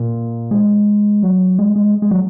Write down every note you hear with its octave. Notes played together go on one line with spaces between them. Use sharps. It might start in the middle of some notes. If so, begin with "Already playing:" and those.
Already playing: A#2
G#3
F#3
G#3
G#3
G#3
F#3